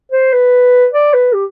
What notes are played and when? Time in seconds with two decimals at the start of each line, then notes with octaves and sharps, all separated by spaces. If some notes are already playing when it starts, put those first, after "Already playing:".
0.12 C5
0.33 B4
0.93 D5
1.14 B4
1.33 G4